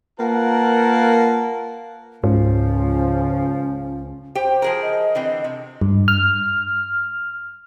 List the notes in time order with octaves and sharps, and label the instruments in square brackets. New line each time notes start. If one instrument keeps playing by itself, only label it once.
[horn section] A#3 F4 A#4 B4 F#5 A5
[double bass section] C#2 [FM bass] G#2 [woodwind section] F3 [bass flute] C#4
[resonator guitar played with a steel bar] G4 G5 [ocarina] C5
[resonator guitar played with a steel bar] F3 G#4 A#4
[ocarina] D#5
[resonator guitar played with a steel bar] D3 E3 C4
C3
[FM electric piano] G2
F6